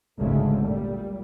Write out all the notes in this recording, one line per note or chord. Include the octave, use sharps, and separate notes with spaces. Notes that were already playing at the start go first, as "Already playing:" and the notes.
G#1 D2 C#3 G#3 A3
A#2 G3